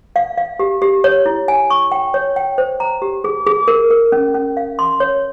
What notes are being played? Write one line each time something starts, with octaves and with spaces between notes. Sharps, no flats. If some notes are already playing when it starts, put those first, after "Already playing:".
F5
F5
G4
G4
C#5
E4
G#5
C#6
G5
C#5
G5
C5
A#5
G4
G#4
G#4
A#4
A#4
C#4
C#4
F5
C6
C#5